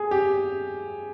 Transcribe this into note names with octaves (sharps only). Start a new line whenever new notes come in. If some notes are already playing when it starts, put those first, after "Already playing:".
Already playing: G#4
G4